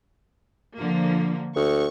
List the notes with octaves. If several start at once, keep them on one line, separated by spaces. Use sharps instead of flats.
D3 F3 A#3
D2 C#6